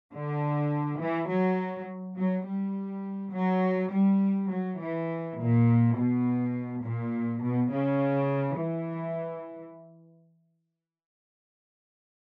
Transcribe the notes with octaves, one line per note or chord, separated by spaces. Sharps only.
D3
E3
F#3
F#3
G3
F#3
G3
F#3
E3
A#2
B2
A#2
B2
C#3
E3